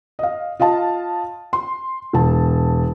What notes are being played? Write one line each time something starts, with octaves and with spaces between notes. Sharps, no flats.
D#5 F5
F4 D#5 F5 A5
C6
E1 A5